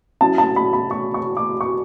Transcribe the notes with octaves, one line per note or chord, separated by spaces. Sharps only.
F#3 C#4 E4 A5
A5
B5
B5
C#6
C#6
D6
C#6